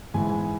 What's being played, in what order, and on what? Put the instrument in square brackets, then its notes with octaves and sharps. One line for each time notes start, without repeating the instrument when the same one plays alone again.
[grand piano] G#2 E3 G#3 G#5